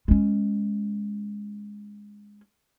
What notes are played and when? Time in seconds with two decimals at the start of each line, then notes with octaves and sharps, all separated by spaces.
0.08 G#3 C#4